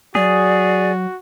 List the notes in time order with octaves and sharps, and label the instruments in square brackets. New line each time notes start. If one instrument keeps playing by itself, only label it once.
[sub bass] F#3 [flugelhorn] F#4 [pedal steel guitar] G#4 [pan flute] D5